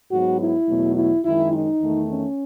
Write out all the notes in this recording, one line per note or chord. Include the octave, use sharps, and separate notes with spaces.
G#2 F#3 B3 F#4
E4
E2 B2 F#3 A3
E4
F#2 D#3 G#3 E4
D#4
E2 D#3 A3
C#4